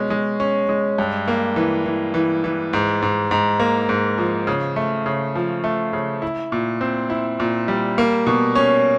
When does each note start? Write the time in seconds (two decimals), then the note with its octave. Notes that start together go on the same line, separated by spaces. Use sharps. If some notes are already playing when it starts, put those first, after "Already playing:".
Already playing: B2 G#3 C#4
0.10 G#3
0.40 C#4
0.69 G#3
0.98 G2
1.28 A#3
1.56 E3
1.86 E3
2.14 E3
2.44 E3
2.73 G#2
3.02 G#2
3.31 G#2
3.60 A#3
3.89 G#2
4.18 F3
4.47 C#3
4.76 A3
5.06 C#3
5.35 F3
5.64 A3
5.93 C#3
6.22 E4
6.52 A#2
6.81 C4
7.10 E4
7.40 A#2
7.68 G3
7.98 A#3
8.26 B2
8.55 C#4